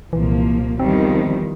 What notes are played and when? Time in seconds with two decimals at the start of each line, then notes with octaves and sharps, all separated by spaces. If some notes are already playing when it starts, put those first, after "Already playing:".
0.13 C2 A#2 E3 F3 A#3
0.80 E2 D#3 F3 G3 C4